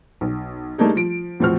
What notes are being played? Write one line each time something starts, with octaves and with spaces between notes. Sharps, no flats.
B1
G3 A3 A#3 D4 D#4 G#4
F3 D7
E2 A2 F3 C4 F#4 F6